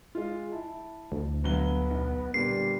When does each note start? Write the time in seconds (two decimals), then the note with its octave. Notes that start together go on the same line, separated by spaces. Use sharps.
0.15 G#3 F4
0.52 E4 A5
1.12 D2
1.44 G1 F#3 B3 G7
1.90 B1
2.34 A#2 D3 G3 B3 C7